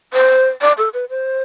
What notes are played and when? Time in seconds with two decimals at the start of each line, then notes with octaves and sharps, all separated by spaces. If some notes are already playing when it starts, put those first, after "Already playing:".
0.13 C5
0.61 D5
0.78 A4
0.94 B4
1.10 C5